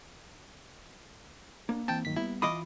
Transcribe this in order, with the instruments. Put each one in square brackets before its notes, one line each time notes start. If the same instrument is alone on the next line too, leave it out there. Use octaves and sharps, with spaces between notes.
[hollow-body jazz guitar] A#3 [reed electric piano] D4
[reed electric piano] E3 C4 [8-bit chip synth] G5 A5
[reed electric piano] G2 D#3 F#3 [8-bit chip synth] B6
[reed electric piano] G3 B3 [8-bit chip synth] E4
[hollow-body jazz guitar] E3 F4 B5 [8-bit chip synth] D#5 D6 D#6